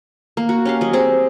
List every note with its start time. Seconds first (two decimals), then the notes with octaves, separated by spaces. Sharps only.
0.37 A#3
0.49 F#4
0.65 C#4 G4 F5
0.81 F#3 D#5
0.93 C4 G4 G#4